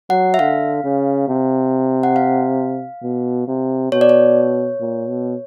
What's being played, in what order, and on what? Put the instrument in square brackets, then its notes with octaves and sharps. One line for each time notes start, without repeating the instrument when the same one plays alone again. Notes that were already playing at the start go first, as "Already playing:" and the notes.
[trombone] F#3 [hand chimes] F#5
[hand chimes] E5
[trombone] D3 [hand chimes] F5
[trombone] C#3
C3
[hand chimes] F#5
F5
[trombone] B2
C3
[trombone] B2 [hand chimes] C#5
[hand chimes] D5
C#5
[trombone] A#2
B2